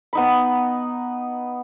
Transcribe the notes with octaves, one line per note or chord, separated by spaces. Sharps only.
B3 D#4 B5